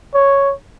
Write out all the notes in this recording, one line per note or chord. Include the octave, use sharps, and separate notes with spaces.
C#5